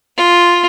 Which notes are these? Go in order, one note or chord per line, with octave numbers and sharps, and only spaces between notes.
F4